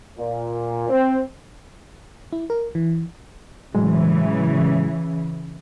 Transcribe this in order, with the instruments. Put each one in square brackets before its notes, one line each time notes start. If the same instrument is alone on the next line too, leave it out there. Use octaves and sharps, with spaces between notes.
[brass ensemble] A#2
C4
[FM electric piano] E4
A#4
E3
[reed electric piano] A2 F#3 G#3 [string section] C#3 E3